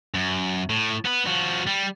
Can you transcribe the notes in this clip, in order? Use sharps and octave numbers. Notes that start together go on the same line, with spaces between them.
F#2
A2
B3 B4
F3 F#4
G3